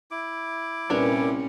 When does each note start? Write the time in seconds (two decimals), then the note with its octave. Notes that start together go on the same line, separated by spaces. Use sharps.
0.11 E4 D6
0.90 C2 A#2 G3 C#4 D4 A#4 B4